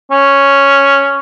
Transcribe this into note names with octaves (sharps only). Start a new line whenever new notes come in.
C#4